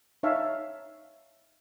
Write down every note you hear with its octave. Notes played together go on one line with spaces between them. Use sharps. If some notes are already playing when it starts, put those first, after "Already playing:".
D#4 C#5 E5 F5 A5